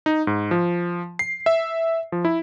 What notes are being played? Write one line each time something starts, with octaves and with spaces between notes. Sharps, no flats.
D#4
G#2
F3
C7
E5
F3
E4